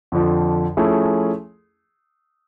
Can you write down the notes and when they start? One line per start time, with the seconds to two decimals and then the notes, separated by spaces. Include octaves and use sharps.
0.12 F2 D3 F3
0.77 F3 A3 C#4 E4 G#4